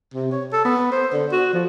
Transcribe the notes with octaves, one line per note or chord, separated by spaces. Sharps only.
C3
C#5
A4
B3
C5
D3
F#4
F3